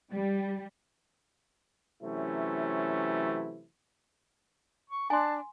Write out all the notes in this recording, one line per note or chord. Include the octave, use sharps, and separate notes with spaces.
G3
C3 E3 F#3 A3 C#4 E4
C#6
D4 G#5 A5 C6